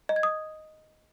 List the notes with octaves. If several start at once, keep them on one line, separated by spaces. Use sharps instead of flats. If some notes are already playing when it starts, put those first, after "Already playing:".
D#5
G#6
D#6